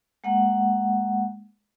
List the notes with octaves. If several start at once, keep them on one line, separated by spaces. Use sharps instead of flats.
G#3 A#3 F#5